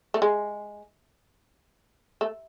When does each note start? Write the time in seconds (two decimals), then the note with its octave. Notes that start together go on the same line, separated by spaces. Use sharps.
0.14 A3
0.22 G#3
2.21 A3